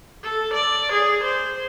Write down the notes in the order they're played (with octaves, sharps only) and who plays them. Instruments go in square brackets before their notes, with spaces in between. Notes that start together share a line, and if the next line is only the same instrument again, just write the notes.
[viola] A4
D5
G#4
C5